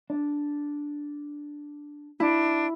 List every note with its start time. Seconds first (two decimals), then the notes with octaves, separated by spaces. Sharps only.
0.10 D4
2.20 D4 E4